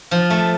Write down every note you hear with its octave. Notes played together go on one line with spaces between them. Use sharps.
F3
A3